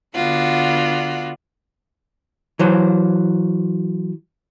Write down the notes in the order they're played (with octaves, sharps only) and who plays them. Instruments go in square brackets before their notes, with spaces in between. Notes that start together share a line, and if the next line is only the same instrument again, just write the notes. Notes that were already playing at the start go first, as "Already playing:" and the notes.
[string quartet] D3 B3 D4 F4 F#4
[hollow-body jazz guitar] E3 F#3 C5